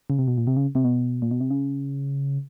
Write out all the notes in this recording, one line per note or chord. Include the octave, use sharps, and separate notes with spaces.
C#3
C3
B2
A#2
C3
C#3
C3
B2
A#2
B2
C3
C#3